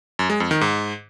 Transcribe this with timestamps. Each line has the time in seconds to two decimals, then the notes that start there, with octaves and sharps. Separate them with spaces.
0.19 F#2
0.30 G#3
0.40 F2
0.51 D#3
0.61 G#2